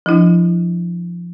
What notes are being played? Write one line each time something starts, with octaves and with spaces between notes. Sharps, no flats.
F3 D4 E4